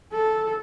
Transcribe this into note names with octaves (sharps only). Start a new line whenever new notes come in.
A4